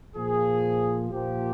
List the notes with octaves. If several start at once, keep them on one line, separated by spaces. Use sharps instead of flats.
A#2 F3 G#4
A#2 F3 G4